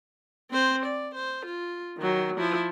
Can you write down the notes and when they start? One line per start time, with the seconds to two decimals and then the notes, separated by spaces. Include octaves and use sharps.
0.51 C4 C5
0.86 D5
1.15 C5
1.46 F4
1.98 D#3 F#3
2.37 F3 E4